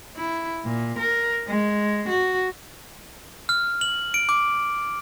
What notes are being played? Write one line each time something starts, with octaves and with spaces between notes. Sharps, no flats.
E4
A#2
A#4
G#3
F#4
F6
F#7
D7
D6